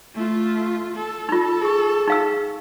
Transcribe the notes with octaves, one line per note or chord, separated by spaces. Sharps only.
A3 F4
A4
D#4 F4
G#4 C#6
D#4 F5 E6